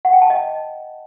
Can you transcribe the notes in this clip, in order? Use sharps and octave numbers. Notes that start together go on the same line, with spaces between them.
F#5
G5
A5
D#5